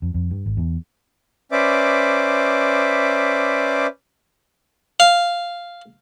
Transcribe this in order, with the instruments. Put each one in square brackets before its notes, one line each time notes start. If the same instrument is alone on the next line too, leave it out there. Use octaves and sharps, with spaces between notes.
[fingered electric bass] F2
F2
G2
G#1
E2
[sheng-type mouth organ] C#4 B4 C5 D5 E5 D6
[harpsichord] F5